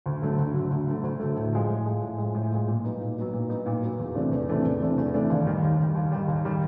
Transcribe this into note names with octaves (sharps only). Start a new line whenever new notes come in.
D2
D3 F#3 A3
D2
D3 F#3 A3
D2
D3 F#3 A3
D2
D3 F#3 A3
A2
F3 G#3
A2
F3 G#3
A2
F3 G#3
A2
F3 G#3
A#2
F#3 B3 D#4
A#2
F#3 B3 D#4
A#2
F#3 B3 D#4
A#2
F#3 B3 D#4
E2
C3 E3 A3 D4
E2
C3 E3 A3 D4
E2
C3 E3 A3 D4
E2
C3 E3 A3 D4
D#2
D#3 G3
D#2
D#3 G3
D#2
D#3 G3
D#2
D#3 G3